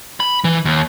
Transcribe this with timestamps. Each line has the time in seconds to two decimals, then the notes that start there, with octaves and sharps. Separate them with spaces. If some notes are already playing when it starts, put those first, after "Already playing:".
0.20 B5
0.44 E3
0.65 D#2